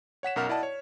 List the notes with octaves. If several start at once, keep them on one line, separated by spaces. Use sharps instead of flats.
C#5 F#5 B6 E7
B1 F#2 A#4 F#5 F6
E4 D5 D#5 F#5 A5
C#5